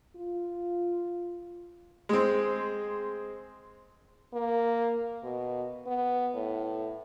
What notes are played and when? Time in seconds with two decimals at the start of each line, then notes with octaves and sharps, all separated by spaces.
0.16 F4
2.09 G#3 C4
4.34 A#3
5.23 B2
5.87 B3
6.34 A2